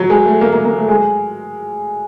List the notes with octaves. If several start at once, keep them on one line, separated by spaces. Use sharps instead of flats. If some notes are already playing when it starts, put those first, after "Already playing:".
Already playing: F#3
G#3
A3
A#3
A#3
A#3
A3
G#3